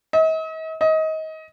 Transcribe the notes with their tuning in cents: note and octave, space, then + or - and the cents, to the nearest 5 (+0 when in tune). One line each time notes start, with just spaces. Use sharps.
D#5 +45
D#5 +25